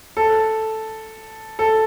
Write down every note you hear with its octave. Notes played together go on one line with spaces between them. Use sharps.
A4
A4